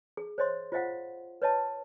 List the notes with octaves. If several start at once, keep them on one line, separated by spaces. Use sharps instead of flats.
G#4
C5 C#5 D#5 C6
F4 C5 D#5 F5 F#5
B4 C#5 D#5 A5